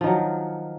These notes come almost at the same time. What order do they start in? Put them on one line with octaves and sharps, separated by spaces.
F3 D#3 F#3